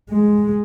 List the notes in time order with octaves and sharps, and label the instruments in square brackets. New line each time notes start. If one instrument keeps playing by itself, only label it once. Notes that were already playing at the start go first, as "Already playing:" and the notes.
[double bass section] G#3